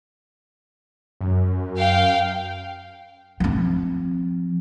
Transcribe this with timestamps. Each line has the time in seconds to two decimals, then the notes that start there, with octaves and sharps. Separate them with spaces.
1.21 F#2
1.77 F5 G5
3.40 F3 C4